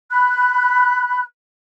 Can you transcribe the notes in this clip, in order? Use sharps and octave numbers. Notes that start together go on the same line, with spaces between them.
B5 F#6